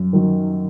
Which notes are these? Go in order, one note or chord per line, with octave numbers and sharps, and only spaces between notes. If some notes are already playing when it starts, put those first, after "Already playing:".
Already playing: F#2
D#3 F#3